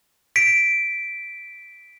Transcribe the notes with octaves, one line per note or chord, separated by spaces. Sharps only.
B6 D7